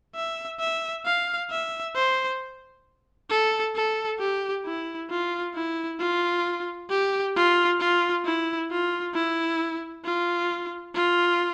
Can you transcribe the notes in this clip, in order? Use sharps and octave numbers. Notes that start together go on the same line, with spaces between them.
E5
E5
F5
E5
C5
A4
A4
G4
E4
F4
E4
F4
G4
F4
F4
E4
F4
E4
F4
F4